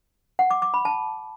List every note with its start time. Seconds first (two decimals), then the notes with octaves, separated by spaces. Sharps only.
0.39 F#5
0.51 D6
0.62 D6
0.74 B5
0.85 A5